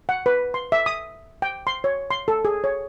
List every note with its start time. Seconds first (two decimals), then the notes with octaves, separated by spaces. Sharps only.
0.09 F#5
0.26 B4
0.54 C6
0.72 E5
0.86 D#6
1.42 G5
1.67 C6
1.84 C#5
2.11 C6
2.28 A4
2.45 G#4
2.64 C#5